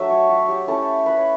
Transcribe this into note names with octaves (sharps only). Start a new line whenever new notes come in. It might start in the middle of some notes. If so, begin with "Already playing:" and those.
Already playing: F#3 A3 D4 E5
C#5
F#4
G4
A3 C#4 E4 A4
B4
C#5